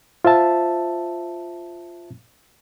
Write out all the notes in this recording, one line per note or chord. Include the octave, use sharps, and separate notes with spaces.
F4 C5 E5 A5